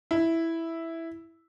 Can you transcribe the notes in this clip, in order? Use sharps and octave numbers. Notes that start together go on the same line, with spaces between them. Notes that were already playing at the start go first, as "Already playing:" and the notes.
E4